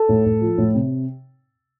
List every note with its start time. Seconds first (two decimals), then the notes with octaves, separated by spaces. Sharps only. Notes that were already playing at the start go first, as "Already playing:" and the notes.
Already playing: A4
0.09 A2
0.26 A2
0.41 F3
0.58 A2
0.74 C3